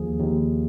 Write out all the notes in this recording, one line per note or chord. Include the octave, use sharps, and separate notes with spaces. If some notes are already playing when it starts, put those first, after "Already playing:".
Already playing: D#2 F3 G#4
D#2